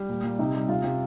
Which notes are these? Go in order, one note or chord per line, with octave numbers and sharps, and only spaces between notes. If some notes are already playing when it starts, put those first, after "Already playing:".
Already playing: G3
A#2
A#2
C3 D#4
G3
C3 F4
C3